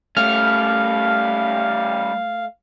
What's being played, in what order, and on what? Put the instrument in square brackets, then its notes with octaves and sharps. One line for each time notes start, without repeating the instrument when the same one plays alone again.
[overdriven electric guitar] G3 C#4 [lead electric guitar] A3 [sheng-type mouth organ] F5 [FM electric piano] F6